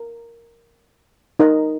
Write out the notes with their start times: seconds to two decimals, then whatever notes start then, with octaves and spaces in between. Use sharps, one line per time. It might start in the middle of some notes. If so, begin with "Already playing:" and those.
Already playing: A#4
1.39 D#4 A#4 D#5